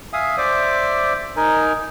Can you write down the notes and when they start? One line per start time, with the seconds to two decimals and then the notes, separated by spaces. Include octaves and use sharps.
0.13 E5 F5 G#5 D#6
0.37 C5 D5 E5 D6
1.36 D#4 A#4 G#5